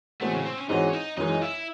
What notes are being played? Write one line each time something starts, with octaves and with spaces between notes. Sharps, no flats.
A2 E3 G#3 A3 C4 F#4
C#3
C4
C#4
G#2 E3 C4 D#4 F#4 C#5
C#4
D#4
F#2 E3 G#3 D#4
E4